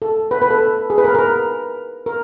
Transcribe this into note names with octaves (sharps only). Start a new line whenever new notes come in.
A4
B4
B4
A4
G#4
B4
A#4
A#4
B4
A#4